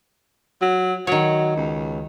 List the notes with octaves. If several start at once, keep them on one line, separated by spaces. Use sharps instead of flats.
F#3
D#3 F#3 C#5
C#2